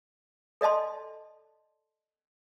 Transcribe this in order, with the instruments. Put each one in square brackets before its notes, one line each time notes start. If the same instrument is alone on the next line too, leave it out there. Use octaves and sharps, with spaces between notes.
[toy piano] A4 D5 D#5 A5 C6